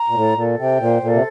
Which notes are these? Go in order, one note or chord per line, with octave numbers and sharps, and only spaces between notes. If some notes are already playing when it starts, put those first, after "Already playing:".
Already playing: A#5
A#2
A2 A4
A#2 A4
C3 G5
A#2 C5
A#2 A4
C3